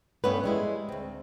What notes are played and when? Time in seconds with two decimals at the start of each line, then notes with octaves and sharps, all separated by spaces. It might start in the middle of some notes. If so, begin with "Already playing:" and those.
0.24 G2 A3 B3 C#4 B4
0.44 G3 G#3 E4
0.89 D2 C4